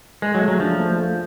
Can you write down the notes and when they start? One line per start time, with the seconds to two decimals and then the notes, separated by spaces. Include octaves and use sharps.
0.22 G#3 G#4
0.35 F#3
0.41 A3
0.48 F#3
0.60 F3 D4
0.79 A3
0.98 A3